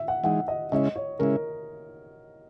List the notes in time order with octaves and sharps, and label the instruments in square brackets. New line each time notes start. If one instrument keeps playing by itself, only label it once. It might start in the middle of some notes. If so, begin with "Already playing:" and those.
Already playing: [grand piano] E5
F#5
[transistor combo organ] E3 G#3 D#4 [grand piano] F#5
[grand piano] D#5
[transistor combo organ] C#3 G#3 C#4 E4 [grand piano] D#5
[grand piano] C#5
[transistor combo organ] C#3 G#3 C#4 E4 [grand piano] A#4